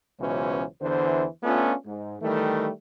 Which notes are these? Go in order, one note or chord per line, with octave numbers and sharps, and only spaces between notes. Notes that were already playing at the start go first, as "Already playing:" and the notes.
C#2 B2 E3 F#3 C#4 C5
E2 D3 E3 C5
A3 B3 C#4 D4 F4
G#2
D#3 E3 G3 A3